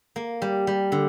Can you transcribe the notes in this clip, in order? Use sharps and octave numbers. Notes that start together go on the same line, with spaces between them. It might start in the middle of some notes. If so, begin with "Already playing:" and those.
A#3
G3
G3
D3